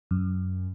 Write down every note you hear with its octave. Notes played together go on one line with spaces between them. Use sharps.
F#2